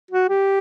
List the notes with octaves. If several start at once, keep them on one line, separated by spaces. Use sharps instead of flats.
F#4
G4